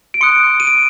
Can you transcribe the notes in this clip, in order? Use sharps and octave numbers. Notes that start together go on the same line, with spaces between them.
D7
C6 D#6 F#6 C#7
D#7
D7